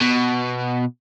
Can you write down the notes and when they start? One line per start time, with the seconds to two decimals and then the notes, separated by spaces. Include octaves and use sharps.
0.01 B2